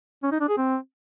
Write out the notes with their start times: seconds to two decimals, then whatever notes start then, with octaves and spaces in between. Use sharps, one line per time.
0.23 C#4
0.32 D#4
0.40 D4
0.49 G#4
0.57 C4